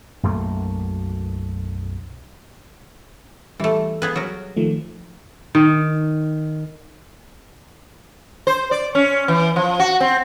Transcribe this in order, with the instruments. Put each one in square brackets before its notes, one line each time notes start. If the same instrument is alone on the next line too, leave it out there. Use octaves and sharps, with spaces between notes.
[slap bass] B1 F#2 A3 A#3
[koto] E3 A3 [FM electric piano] G3
[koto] B3 G#4 B4
F#3 A#4
[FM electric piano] D#3 F3 A3
[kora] D#3
[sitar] C5
D5
C#4
E3
F3
F#4
C4